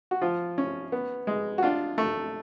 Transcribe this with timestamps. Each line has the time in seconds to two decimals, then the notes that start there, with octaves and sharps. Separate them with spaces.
0.11 F#4
0.22 F3 F4
0.58 C#4
0.92 B3
1.27 G#3
1.58 F#4
1.63 D4 F4
1.98 A3